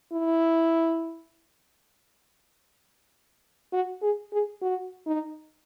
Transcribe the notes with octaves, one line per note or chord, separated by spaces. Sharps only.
E4
F#4
G#4
G#4
F#4
D#4